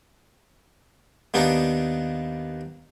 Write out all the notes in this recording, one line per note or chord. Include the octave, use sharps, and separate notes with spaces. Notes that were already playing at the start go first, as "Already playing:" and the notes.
D#2 B3 D4 D#4